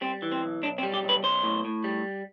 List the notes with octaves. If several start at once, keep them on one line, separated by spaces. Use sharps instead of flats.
G3 C4
E3
C4
B1
B1 D4
C4
G3
G4
B1
B4
B1 C5
A2
A2
G3